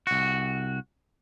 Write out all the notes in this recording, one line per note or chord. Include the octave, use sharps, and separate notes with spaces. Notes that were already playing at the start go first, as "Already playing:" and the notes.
C2 F#4